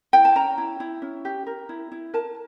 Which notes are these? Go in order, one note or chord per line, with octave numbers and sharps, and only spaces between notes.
E4 G5
A5
C#4 A#5
E4
E4
C#4
G4
A#4
E4
E4
A#4 A5